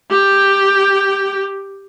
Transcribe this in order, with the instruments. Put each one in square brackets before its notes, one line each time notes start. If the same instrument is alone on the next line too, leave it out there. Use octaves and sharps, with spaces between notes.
[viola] G4 G5